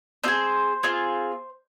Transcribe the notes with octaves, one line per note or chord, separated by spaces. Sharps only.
C4 F4 G#4 C5
C4 F4 G#4